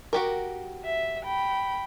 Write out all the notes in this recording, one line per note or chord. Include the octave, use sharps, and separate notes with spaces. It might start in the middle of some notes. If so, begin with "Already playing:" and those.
F#4 G4 A#4
E5
G5 B5